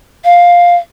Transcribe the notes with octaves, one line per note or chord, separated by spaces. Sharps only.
F5